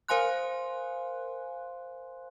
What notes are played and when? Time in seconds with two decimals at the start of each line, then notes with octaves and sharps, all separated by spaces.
0.08 A#4 C5 F5 G#5 C6 F#6